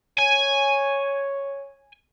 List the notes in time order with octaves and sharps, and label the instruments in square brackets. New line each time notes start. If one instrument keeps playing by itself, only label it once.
[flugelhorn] C#5 [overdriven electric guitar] G#5